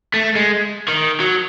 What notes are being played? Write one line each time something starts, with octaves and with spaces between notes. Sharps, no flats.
A3
G#3
D#3
F#3